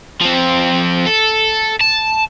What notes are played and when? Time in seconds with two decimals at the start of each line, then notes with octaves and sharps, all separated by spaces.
0.21 F3 C4
1.06 A4
1.81 A5